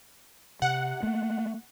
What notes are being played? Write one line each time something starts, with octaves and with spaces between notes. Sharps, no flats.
C3 F#5
A3 A#3